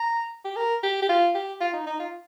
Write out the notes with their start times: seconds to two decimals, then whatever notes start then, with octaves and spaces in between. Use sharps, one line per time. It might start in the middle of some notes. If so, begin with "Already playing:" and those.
Already playing: A#5
0.45 G4
0.56 A#4
0.83 G4
1.02 G4
1.09 F4
1.34 G4
1.60 F4
1.73 D#4
1.86 D#4
1.99 F4